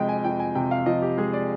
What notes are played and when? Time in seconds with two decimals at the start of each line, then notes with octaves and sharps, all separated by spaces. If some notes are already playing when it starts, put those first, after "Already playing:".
Already playing: F2 C3 F3 G#3 D#5 G5
0.09 G#5
0.24 F2 G5
0.40 G#5
0.55 C3 G5
0.71 F5
0.86 F3 D#5
1.02 G4
1.17 G#3 G#4
1.33 D5